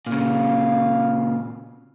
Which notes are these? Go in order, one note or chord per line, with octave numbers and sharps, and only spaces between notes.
A#2 C#3 F5